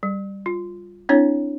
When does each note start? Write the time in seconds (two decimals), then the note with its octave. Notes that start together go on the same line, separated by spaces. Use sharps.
0.03 G3
0.46 F4
1.09 C4 D4 E4 C#5